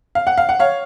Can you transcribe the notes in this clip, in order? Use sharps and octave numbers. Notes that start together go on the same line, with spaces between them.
F5
F#5
F5
F#5
C#5 F5